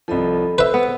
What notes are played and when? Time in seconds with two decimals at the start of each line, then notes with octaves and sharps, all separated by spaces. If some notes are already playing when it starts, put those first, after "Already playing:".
0.08 C2 F3 A4 D#5 B5
0.58 B4 C5 E5
0.74 B3